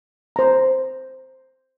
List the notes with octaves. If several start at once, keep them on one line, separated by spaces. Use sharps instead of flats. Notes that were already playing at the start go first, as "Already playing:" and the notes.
C5 A#5